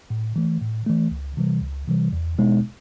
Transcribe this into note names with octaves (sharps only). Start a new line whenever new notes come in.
A2
E3 A3
A2
E3 A3
C#2
C3 E3 G3
C#2
C3 E3 G3
E2
B2 G#3 B3 D#4